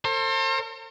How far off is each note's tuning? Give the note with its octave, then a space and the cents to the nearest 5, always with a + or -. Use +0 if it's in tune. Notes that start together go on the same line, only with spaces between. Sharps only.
A4 +45 C5 +35